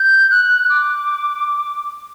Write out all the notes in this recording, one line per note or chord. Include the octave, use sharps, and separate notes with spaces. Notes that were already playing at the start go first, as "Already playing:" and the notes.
Already playing: G6
F#6
D6